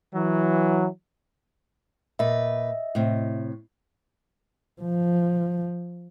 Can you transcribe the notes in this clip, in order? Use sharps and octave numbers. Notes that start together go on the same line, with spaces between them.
E3 F#3
A#2 B4 D#5 E5
A2 C3
F3